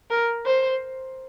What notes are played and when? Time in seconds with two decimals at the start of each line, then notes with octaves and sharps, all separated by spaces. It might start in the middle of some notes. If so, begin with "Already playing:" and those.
0.11 A#4
0.45 C5